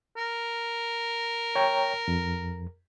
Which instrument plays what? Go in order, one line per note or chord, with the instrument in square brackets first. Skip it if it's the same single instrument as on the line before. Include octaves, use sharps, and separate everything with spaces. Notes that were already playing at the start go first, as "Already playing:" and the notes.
[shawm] A#4
[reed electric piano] C#5 G5 A#5
F2